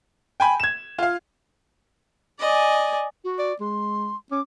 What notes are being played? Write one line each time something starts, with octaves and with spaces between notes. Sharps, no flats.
G5 G#5 B5
G#6 E7
F4 F5
D5 D#5 G#5
F#4
D5
G#3 C6
C#4 D6